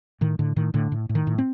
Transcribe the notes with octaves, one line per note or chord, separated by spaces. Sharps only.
A2 D#3
A2 D3
A2 D#3
A2 D3
A2
A2
D#3
A2
C4